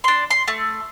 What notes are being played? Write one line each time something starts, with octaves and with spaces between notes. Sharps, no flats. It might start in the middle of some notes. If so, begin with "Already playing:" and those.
D4 C6
C6
A3